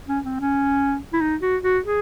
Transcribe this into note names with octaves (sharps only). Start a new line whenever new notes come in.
C#4
C4
C#4
E4
D#4
F#4
F#4
G#4